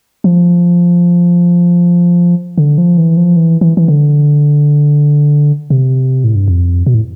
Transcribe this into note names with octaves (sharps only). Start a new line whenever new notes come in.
F3
D3
F3
E3
F3
E3
E3
E3
D3
C3
A2
G2
F2
B2
A2